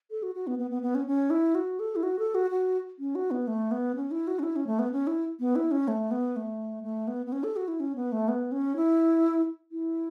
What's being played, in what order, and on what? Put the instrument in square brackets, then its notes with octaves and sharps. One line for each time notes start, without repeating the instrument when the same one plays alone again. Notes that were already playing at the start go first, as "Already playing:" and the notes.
[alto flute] A4
F#4
F#4
B3
B3
B3
B3
C#4
C#4
E4
F#4
A4
E4
F#4
A4
F#4
F#4
C#4
F#4
B3
A3
B3
C#4
E4
F#4
C#4
E4
C#4
A3
B3
C#4
E4
B3
E4
C#4
A3
B3
A3
A3
B3
B3
C#4
A4
F#4
E4
C#4
B3
A3
B3
C#4
E4
E4